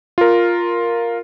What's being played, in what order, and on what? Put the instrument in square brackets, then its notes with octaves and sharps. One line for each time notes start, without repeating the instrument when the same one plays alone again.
[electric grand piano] F4 A#4